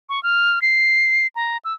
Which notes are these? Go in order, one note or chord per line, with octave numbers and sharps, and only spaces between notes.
C#6
F6
C7
A#5
E6